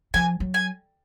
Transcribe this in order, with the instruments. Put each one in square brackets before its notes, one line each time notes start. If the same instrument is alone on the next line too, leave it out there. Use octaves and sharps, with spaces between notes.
[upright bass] F3 [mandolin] G#5
[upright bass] F#3
[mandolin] G#5